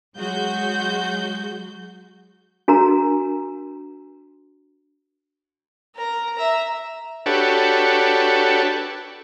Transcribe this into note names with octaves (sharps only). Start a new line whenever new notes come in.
F#3 G#3 F#4 G6
D4 F#4 A#4 A#5
A#4 A#5
E5 A#5
D4 F#4 G4 A4 B4 C#5